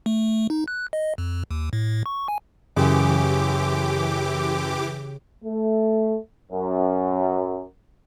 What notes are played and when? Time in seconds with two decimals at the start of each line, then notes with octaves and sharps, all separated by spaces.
0.06 A3
0.50 D#4
0.68 F#6
0.93 D#5
1.18 F2
1.51 D#2
1.73 A2
2.06 C#6
2.28 G#5
2.76 F#2 C#3 E3 G4 D6
5.45 A3
6.52 F#2